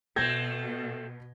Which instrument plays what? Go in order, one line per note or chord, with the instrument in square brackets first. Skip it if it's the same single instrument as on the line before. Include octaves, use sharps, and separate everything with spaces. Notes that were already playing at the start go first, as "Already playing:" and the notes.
[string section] B2 [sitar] A3 C4 [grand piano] G6 G#6 A#6